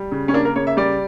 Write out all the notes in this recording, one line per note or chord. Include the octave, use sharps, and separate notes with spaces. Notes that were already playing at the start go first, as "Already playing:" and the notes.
Already playing: G3
C#3
C#4
A#3 D4
A#4
C#3 C#5
E5
G3 D5